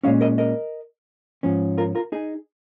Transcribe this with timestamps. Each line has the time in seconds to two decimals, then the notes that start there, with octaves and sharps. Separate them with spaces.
0.04 A#2 G#3 C#4 C#5 F5
0.21 A#4 D#5
0.38 A#4 D#5
1.43 G#2 F3 C#4
1.78 F4 A#4
1.95 F4 A#4
2.12 D#4 G#4